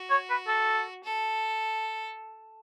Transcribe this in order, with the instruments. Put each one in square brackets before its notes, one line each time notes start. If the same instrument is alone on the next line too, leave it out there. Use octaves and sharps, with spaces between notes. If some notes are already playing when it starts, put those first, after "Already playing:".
Already playing: [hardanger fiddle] F#4
[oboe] C#5
B4
A4
[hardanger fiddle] A4